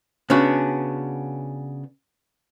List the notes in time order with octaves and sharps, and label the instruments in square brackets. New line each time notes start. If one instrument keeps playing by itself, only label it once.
[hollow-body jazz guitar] C#3 B3 C#4 D4 F#4